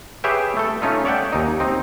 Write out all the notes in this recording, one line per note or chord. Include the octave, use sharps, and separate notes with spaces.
G4 G#4 B4 C#5 E5 G5
A3 A4
A3 C#4 D#4 F4
C#5 D5 E5 F#5 G5
D#2 D#4
C4 D#4